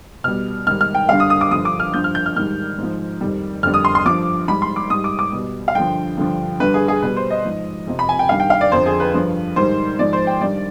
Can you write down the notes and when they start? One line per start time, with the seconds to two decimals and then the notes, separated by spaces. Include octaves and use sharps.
0.24 B2 G3 F6
0.67 G#2 D#3 G3 F6
0.81 F6
0.95 G5
1.09 G2 D3 G3 F5
1.20 D#6
1.30 D#6
1.41 D6
1.51 G2 D3 F3 D#6
1.65 D6
1.80 F6
1.94 G2 F3 G6
2.04 F6
2.15 G6
2.26 F6
2.36 G#2 D#3 G3 F6
2.78 G#2 F3
3.21 F2 D#3 G3
3.63 F2 D3 G3 F6
3.74 D#6
3.85 C6
3.95 C6
4.05 G2 F3 D6
4.48 G#2 G3 B5
4.62 C6
4.76 D6
4.90 G#2 G3 D#6
5.04 D6
5.19 D6
5.33 B2 G3
5.68 F5
5.75 G2 D3 F3 G5
6.17 G2 D3 F3
6.60 G2 D3 G3 B4
6.74 G#4
6.88 G#4
7.02 B2 G3 B4
7.17 C5
7.30 D#5
7.45 G#2 F3
7.87 F2 C3 F3
7.99 B5
8.09 G#5
8.19 G5
8.29 G2 D#3 G3 F5
8.40 G5
8.50 F5
8.61 D5
8.72 F2 D3 F3 C5
8.86 G#4
9.00 B4
9.14 G2 F3
9.56 G#2 D#3 G3 C5
9.99 G#2 F3 D5
10.13 C5
10.27 G5
10.41 G2 D#3 G3 D5